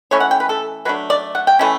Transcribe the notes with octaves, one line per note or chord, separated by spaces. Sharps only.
E3 A3 C#4 C#5
F#5
G5
B4
A4
F#3 A3 D4 B4
D5
F#5
G5
E3 A3 C#4